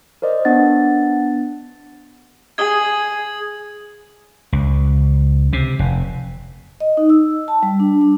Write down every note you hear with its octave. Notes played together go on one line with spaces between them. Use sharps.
A#4 C5 D5 D#5
B3 D4 F#5 A6
G#4 D#6 G#6
C#2
C3
F1
D#5
D#4
E6
A5
G3
D4
D4